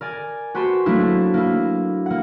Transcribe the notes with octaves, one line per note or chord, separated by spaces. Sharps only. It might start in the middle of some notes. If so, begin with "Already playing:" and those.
A#4 D5 G#5
F#4 G4 B4 C5 A5
F#3 A3 A#3 D4 E4
A#3 E4
A#3 F#5